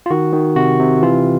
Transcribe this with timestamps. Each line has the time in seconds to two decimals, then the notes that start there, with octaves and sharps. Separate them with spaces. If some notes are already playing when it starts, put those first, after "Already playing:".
0.06 F4
0.10 D#3 F#4
0.33 D#3
0.56 C3 F#4
0.79 C3
1.02 E3 F4